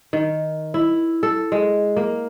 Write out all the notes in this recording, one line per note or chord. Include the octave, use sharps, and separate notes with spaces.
D#3
E4
A4
G#3
A#3